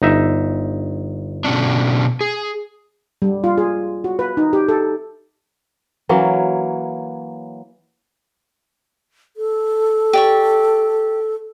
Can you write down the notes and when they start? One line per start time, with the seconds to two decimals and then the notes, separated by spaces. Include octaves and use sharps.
0.02 G1 D#4 E5
1.45 B2 C#4 D4
2.21 G#4
3.22 G3
3.44 F4
3.58 G#4
4.04 F#4
4.19 B4
4.37 D#4
4.53 G4
4.68 A4
6.09 E3 F#3 A#3 C#4
9.37 A4
10.13 G4 D5 C#6